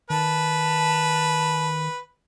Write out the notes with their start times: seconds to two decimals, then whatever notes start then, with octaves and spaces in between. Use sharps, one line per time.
0.10 D#3 B4 A5